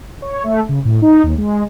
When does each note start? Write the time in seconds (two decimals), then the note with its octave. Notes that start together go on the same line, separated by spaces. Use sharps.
0.22 C#5
0.44 A3
0.69 C#3
0.85 A2
1.02 D#4
1.24 D#2
1.38 G#3